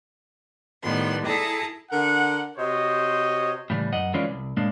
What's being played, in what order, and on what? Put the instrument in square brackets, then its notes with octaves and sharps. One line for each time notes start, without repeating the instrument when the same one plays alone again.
[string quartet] A2 D#3 G3 B3 C6
E4 G#4 A4 A5 A#5
[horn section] D3 A#4 F#5
C3 F#4 C5 C#5 D#5
[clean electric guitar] A2 C#3 E3 G3
F#2 D#5 F#5
E3 G#3 C#4 F4 C#5 D5
C2
A2 G#3 A#3 D4